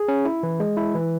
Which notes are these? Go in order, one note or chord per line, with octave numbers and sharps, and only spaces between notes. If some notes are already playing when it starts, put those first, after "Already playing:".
Already playing: G#4
C#4
E4
E3
G#3
E4
E3